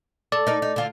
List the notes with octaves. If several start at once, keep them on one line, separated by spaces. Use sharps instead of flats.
A4 D5
D#4 A#4
D#4
D3 F4